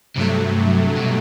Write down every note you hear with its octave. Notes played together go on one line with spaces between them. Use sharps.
G2 C3 F#3 A3
C3
B2